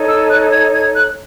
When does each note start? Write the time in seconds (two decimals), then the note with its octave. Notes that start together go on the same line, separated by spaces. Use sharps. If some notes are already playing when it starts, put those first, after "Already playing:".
Already playing: D#4 A4 C#5
0.08 E6
0.29 F#6
0.52 G#6
0.73 G#6
0.95 F#6